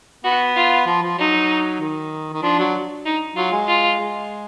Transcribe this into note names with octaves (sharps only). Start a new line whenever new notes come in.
B3 F#4
F4
F3
F3
F#3 D#4
D#3
D#3
F3 D4
F#3
D#4
F#3 F4
G#3
F4
G#3